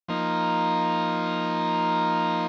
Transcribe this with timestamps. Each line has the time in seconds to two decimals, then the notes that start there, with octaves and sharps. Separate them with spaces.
0.08 F3 A#3 D#4